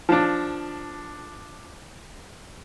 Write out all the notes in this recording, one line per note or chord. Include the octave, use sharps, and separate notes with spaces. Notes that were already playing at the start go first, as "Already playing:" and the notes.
F3 D4